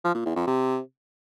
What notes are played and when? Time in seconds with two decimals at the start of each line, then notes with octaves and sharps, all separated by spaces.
0.04 F3
0.15 A#2
0.26 E2
0.36 F2
0.47 C3